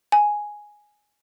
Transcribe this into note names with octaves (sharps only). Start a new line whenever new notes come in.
G#5